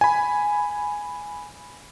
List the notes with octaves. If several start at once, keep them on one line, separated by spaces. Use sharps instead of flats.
G#5 B5